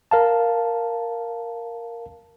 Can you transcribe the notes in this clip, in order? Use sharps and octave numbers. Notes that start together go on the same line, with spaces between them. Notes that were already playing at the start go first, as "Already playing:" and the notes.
A#4 F5 A5